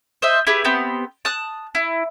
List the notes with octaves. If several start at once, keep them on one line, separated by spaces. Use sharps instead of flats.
C5 D#5 E5
E4 G4 G#4 B4
B3 C4 G4
A5 D#6 F#6
E4